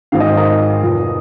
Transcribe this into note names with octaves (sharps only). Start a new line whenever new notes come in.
G#1 G#2 D#3 F5
D#5
C5
A#4 D#5
F1 F2 F3